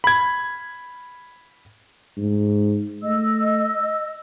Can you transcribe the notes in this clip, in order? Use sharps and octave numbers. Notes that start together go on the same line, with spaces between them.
B5 G#6
G#2
A3 D#5 E6